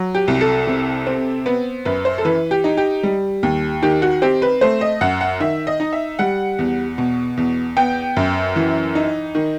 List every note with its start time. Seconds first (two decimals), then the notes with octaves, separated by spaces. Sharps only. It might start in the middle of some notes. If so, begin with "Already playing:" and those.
Already playing: F#3
0.15 G4
0.28 C2
0.41 A4
0.67 C3
1.07 C4
1.46 B3 B4
1.85 F#2 B4
2.05 C5
2.18 A4
2.25 E3 B4
2.51 G4
2.64 D#4
2.77 G4
3.03 G3
3.43 D#2
3.82 D#3 G4
4.02 F#4
4.22 C4 G4
4.42 B4
4.61 A3 C5
4.81 D#5
5.01 F#2 F#5
5.21 F#5
5.40 D#3 E5
5.67 D#5
5.80 D#4
5.93 E5
6.19 G3 F#5
6.59 E2
6.98 B2
7.37 E2
7.77 B3 G5
8.17 F#2
8.56 E3
8.95 D#4
9.35 D#3